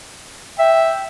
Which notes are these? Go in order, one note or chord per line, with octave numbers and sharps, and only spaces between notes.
E5 G5